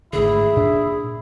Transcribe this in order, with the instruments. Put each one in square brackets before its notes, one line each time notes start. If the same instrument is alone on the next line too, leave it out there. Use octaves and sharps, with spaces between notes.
[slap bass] G#1 A2 D3 [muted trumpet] E4 [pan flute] G#4
[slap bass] A#2 D4